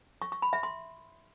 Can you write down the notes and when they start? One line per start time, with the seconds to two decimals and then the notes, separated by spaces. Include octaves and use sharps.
0.22 C#6
0.32 C#6
0.42 B5
0.53 E5
0.63 C6